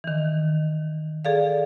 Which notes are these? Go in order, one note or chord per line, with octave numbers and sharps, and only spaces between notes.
D#3 E3
G#4 A4 D5 F5